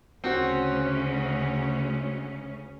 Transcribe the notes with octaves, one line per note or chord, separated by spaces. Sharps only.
D2 C#3 C4 C#4 F#4